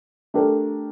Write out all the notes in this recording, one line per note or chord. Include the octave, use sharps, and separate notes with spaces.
A3 D4 G4 A#4